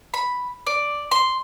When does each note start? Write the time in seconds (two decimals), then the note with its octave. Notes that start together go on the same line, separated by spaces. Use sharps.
0.14 B5
0.67 D5
1.11 C6